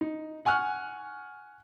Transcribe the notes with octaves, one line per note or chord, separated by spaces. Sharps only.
D#4
F#5 G#5 C#6 F6 F#6